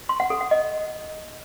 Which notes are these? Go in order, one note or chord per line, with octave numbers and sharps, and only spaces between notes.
C6
F#5
A4
F#5
D#5